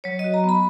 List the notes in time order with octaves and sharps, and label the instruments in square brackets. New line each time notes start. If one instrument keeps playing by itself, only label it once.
[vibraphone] F#3 C#5
D#5
F#4
A#5
B3 B5